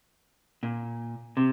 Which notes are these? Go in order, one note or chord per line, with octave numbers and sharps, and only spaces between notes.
A#2
C3